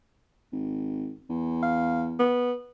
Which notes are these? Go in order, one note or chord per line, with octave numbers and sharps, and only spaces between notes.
G#1
E2
F5
B3